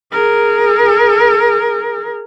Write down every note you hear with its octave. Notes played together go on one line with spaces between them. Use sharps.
G#4 A#4